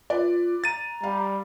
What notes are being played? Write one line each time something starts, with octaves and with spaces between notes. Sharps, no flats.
F4 B4 D5
A#5 A6 D#7
G3 F5